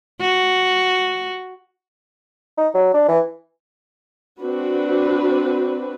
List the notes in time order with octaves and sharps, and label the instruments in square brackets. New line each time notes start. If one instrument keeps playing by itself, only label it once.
[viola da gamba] F#4
[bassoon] D#4
F#3
D4
E3
[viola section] C4 D4 F#4 B4